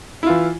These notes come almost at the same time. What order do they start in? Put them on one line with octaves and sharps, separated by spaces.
E4 F4 E3